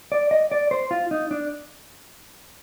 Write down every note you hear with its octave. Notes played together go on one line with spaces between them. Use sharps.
D5
D#5
D5
C5
F4
D#4
D4